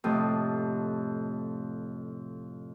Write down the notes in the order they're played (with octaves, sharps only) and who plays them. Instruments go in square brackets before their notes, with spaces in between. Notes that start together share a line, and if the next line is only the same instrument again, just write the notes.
[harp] F2 A2 C3 D#5